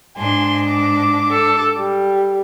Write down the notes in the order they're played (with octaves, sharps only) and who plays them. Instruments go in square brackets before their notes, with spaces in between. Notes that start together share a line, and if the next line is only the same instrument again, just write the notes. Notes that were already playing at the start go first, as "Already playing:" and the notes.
[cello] G#2 D4 [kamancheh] G#5 C6
[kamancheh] D6
[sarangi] A4
G3